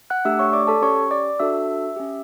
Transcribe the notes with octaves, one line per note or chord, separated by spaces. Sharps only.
F#5 F#6
A3 D4 G4 E5 E6
C#5 C#6
D5 D6
A4 A5
C#4 G4 C#5 C#6
D5 D6
D4 F#4 A4 E5 E6
C#4 G4